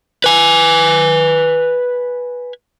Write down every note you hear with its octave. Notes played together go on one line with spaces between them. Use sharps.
B4 G#5